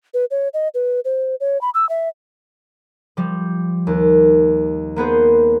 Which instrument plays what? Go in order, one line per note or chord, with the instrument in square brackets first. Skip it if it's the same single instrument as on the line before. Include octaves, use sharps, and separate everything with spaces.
[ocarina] B4
C#5
D#5
B4
C5
C#5
B5
E6
E5
[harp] F3 G3
D#2
A#3 B3 G#4 C5